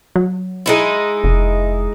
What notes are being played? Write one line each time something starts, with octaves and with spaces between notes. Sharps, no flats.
F#3
G#3 D#4 E4
F1